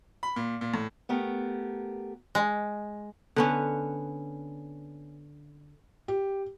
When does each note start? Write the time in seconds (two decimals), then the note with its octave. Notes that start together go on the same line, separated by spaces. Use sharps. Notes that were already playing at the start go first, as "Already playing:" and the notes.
0.23 B5
0.36 A#2
0.61 A#2
0.74 A2
1.09 A3 B3 G4 A#4
2.35 G#3
3.36 D3 B3 C#4
6.08 G4